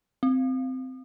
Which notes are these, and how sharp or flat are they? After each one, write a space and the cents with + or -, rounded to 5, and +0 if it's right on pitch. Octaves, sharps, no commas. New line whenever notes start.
C4 -15